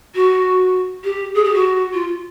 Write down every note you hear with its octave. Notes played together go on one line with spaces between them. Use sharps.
F#4
G4
G#4
G4
F#4
F4